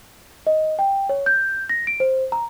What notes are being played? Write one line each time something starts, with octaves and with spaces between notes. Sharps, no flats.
D#5
G5
C#5
G6
A#6
D7
C5
A#5